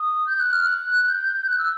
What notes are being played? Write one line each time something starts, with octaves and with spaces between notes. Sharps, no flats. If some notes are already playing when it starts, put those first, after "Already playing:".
Already playing: D#6
G6
F#6
F6
F#6
G6
F#6
E6